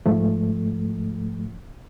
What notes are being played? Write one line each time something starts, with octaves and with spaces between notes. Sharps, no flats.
G#2 F3 A3